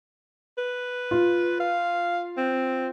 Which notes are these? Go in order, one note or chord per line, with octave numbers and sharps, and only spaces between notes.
B4
F4
F5
C4